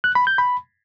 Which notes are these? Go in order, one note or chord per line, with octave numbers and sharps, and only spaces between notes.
F#6
B5
G6
B5